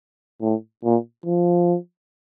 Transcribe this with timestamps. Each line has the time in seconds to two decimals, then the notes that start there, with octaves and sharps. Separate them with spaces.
0.42 A2
0.84 A#2
1.26 F3